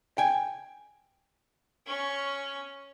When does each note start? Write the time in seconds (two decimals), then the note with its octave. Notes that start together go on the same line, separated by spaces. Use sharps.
0.18 G5 G#5
1.87 C#4 C#6